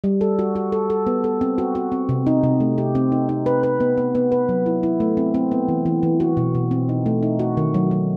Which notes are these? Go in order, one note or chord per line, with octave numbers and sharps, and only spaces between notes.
G3
A4
F#4
F#4
A4
A4
B3
A4
C4
F#4
F#4
C4
C3
D#4
C3
A3
G4
C4
D#4
D#4
B4
B4
B3
B3
B3
B4
F#3
E4
E4
A3
C4
C4
B3
E3
E3
E3
F#4
B2
B2
C4
D#4
A3
D#4
F#4
D#3
F#3
F#3